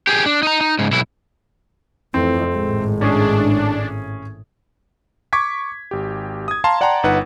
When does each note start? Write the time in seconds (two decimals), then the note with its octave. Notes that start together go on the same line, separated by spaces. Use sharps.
0.07 G4 G#4
0.26 D4
0.43 D#4 A#5
0.61 D#4
0.79 G#2 C#3
0.91 B1 E4
2.14 F2 E3 A3 C4
2.55 G#1 A2 G#3
3.01 C#4 D4 G#4
5.33 C#6 D6 G#6 B6
5.91 G#1 G4
6.48 D#6 G#6
6.64 F5 A5 A#5 C6
6.81 D5 F#5 G5 A5 A#5 C6
7.03 G1 D#4 B4 F#5